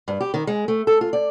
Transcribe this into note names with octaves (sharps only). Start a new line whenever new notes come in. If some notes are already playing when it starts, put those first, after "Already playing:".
G2
G4
D#3
G#3
A3
A4
F4
D5